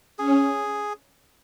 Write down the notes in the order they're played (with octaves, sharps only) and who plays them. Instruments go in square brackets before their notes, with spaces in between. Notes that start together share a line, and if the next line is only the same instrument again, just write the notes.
[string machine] C#4 [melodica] G#4